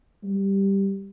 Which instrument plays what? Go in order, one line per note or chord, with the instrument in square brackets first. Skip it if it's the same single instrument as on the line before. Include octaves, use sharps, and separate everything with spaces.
[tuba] G3